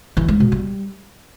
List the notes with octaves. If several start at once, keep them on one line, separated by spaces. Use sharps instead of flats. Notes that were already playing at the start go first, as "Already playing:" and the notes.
E3
G#3
B2
G3